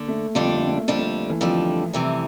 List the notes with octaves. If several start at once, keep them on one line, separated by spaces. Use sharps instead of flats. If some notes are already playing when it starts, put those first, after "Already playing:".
Already playing: D3 A#3
A3
F2 D3 G3 A3 D4
A#3
A3
A#3
A3
F2 D3 G3 A#3 D4
A3
E3
F2 D3 F3 G3 D4
C3 E3 G3